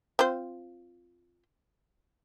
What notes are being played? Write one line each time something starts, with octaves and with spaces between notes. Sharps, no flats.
C4 F4 C5